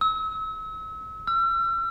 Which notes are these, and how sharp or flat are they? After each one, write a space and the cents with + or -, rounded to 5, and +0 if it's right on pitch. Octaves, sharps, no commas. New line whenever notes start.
E6 -35
E6 +45